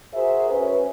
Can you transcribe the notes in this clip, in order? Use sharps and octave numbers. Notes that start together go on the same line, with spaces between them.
F#4 G#4 A#4 C5 E5
C#4 B4